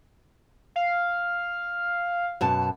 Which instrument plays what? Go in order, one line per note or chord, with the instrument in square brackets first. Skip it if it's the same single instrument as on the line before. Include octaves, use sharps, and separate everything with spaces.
[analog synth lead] F5
[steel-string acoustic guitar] F#2 B2 A5